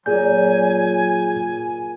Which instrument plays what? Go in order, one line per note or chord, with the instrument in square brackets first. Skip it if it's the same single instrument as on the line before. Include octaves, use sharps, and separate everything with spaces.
[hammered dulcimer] A#2 [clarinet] F#3 [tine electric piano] G#4 G6 [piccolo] G#5